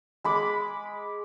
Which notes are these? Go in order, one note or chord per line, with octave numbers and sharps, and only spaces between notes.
G#3 B5 D6